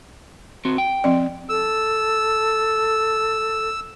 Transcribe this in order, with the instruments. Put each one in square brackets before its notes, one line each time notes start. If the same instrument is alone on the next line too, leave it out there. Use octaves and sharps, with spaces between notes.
[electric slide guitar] C4 F#4
G5
[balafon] F3 C4 D5
[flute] A4 [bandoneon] E6